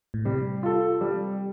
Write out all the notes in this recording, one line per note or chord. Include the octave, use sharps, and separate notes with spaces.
A2
C3 G3
F4 A4
G3